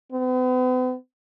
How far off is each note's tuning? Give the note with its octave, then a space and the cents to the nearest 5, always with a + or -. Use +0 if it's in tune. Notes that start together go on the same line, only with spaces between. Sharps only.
B3 +45